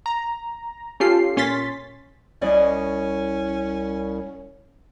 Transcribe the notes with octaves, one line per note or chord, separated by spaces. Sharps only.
A#5
C#4 F4 G4 A4 C7
A#2 C#4 C6 A6 B6
C2 C#4 D5 D#5